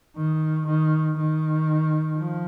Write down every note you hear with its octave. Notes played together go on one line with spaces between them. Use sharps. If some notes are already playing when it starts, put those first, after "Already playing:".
D#3
D#3
D#3
F3